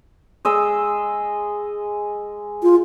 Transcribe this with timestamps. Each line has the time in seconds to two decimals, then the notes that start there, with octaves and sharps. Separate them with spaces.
0.45 G#3 D#5 E6
2.63 F4